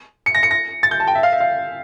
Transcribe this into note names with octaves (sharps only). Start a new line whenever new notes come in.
C#7
A#6
C#7
A#6
A6
G6
A5
G5
E5
F5
E5
F5